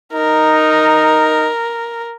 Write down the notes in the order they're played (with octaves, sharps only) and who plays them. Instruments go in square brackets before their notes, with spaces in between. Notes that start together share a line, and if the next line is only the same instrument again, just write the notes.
[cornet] D#4 [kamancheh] A#4